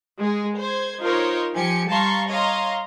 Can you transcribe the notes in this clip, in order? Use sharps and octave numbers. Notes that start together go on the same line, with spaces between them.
G#3 G#4
C5 G#6
D#4 F4 A#4 C5 C#5
F3 G4 G#5 C#7
G3 F5 A5 A#5 C6 C#6
C#5 D#5 F5 A#5 C6